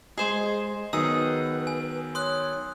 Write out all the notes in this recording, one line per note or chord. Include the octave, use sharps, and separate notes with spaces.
G#3 G#4 C5 D#5 G#5
D#3 F#3 B3 D#4 G#4 B4 E6
G#5
C#5 C6 D#6 F#6